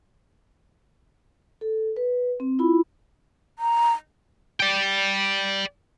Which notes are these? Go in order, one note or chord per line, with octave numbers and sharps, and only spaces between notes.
A4
B4
C4
E4 F4 B5
A#5
D5 G5